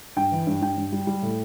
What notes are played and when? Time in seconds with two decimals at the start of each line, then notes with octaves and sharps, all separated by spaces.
0.16 G2 G5
0.32 E3
0.47 G2
0.62 G2 G5
0.77 G2
0.92 G3
1.07 G3
1.22 A2